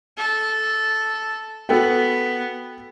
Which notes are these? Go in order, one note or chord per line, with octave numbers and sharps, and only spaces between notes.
A4
B3 F#4 A4 G5